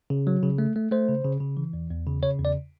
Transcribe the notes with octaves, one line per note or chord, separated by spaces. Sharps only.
C#3
F#3
C#3
A3
A3
A3 C5
C#3
C#3
C#3
E3
E2
E2
C#3
C#3 C#5
E2
D5